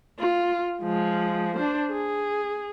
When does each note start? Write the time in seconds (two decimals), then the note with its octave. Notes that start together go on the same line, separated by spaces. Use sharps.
0.19 F4
0.82 F3 G#3
1.57 D4 C5
1.91 G#4